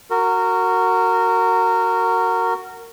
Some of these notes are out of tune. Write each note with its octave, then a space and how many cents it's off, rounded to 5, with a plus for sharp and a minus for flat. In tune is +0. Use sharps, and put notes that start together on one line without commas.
F#4 +0 A#4 -20